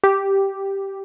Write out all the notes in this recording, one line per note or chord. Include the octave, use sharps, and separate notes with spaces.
G4